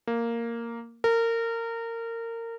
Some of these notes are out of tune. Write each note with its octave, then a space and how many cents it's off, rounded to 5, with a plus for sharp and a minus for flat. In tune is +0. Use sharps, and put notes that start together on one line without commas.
A#3 -5
A#4 -25